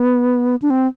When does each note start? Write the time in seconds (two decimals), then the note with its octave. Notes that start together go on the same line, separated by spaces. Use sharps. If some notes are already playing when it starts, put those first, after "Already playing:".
Already playing: B3
0.62 D4
0.70 C4